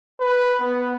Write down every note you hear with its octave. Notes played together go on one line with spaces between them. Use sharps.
B4
B3